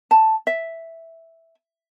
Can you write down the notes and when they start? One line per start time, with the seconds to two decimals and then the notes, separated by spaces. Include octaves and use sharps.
0.11 A5
0.47 E5